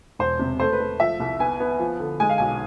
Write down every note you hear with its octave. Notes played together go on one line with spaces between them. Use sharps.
E1 C5
C3
A3 C5
B4
A3
F3 E5
C2
B3 G#5
B3
F3
D3
G#3 G#5
F5
B1 G#5